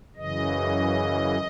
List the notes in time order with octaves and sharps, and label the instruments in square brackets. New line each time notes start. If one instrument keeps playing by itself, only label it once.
[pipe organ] F#2 C#3 E3 D#5